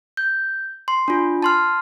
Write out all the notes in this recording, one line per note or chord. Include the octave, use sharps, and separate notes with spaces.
G6
C6
D4 F4
A5 C6 F6